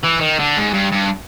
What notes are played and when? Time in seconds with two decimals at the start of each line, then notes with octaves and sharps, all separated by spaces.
0.04 E3
0.21 D#3
0.40 D3
0.57 G#2
0.74 G2
0.92 G2